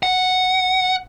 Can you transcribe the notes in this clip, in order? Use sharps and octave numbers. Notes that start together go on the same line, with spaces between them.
F#5